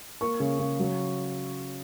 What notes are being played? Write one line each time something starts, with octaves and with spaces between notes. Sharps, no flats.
A#3 C#6
C#3
C#3
F#3